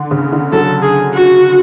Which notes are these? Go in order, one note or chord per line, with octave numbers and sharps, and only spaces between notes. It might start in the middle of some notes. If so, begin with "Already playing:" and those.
Already playing: D3
C#3
D3
F#3 A4
G#4
F#4